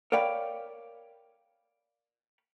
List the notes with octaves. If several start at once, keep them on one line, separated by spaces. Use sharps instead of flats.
A#4 C#5 D5 F5 G5 B5